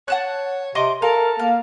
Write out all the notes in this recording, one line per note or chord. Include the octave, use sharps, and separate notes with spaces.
C#5 F#5 A5 F#6
C3 D#5 C6 D6
A4 A#4 F5
A#3 F5